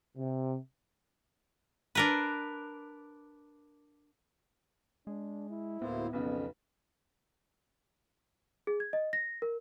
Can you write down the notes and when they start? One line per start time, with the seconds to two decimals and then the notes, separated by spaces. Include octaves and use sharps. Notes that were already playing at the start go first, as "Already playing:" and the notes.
0.18 C3
1.95 D4 A#4 B4
5.07 G#3 D4
5.50 E4
5.82 D2 A2 A#3 B3 C5
6.13 B1 F2 C#3 B4
8.67 G#4
8.80 G#6
8.93 D#5
9.13 A#6
9.42 A#4